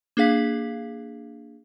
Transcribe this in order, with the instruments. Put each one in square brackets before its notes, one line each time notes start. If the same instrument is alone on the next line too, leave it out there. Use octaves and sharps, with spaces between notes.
[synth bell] A#3 D4 G#4 F5 B6